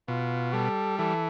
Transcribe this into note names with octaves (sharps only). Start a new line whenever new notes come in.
B2 F4
G3 A4
E3 A4